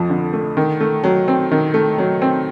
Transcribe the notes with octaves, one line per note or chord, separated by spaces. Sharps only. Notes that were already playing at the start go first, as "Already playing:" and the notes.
Already playing: F2 F3
D3
A3
D#3
A3
F#3
C4
D#3
A3
F#3
C4